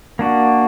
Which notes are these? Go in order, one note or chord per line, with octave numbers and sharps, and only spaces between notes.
A#3 D4 F#4